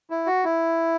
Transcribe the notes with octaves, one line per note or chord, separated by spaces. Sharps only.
E4
F#4
E4